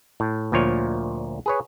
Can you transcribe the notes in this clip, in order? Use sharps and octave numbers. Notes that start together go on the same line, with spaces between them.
A2
D2 A#2 F3 C#5
G#4 B4 C#5